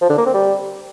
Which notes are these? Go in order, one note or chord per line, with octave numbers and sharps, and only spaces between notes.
F3
D3
A#3
C4
G3